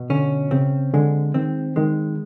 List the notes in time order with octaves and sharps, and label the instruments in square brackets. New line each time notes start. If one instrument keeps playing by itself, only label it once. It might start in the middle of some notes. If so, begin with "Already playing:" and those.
Already playing: [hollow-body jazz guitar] B2
[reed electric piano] D3 [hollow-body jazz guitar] C#4
[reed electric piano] C#3 [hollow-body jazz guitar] C4
[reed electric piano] D3 [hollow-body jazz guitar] G#3
[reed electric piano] D#3 [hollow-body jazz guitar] C4
[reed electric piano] D#3 [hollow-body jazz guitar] G#3